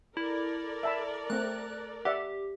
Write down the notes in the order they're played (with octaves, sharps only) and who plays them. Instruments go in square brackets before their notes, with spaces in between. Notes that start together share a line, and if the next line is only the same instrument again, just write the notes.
[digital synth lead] E4 [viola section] A4 A#4 D5
[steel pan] E5 A5 B5
[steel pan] A3 C4 [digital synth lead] F#6
[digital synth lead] G4 [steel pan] D5 E5 F#5